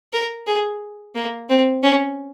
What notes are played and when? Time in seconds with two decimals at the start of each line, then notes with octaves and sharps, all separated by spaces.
0.13 A#4
0.47 G#4
1.15 A#3
1.49 C4
1.83 C#4